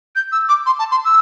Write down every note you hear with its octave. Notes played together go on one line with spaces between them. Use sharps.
G6
E6
D6
C6
A5
C6
E6